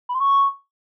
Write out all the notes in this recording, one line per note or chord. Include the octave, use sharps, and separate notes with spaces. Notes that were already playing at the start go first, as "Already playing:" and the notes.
B5
C6
C#6